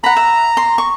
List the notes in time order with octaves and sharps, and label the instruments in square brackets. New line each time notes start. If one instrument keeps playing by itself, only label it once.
[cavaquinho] F#5 B5 [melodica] A#5
[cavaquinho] E5
C6
C#6